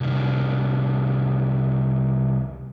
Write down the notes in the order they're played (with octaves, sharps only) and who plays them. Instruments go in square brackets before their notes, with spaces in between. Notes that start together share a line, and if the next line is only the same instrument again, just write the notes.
[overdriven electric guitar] C2 D#3